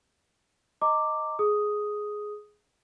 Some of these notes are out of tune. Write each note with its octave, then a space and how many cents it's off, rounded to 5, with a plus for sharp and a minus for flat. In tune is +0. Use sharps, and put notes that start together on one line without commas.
D#5 +0 A#5 -30 D6 +0
G#4 +10 D#6 +0